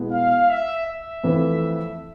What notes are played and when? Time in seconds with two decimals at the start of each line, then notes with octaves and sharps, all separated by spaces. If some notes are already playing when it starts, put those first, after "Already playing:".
Already playing: B2 G#3 B3 E4
0.10 F5
0.48 E5
0.86 E5
1.24 F2 E3 A3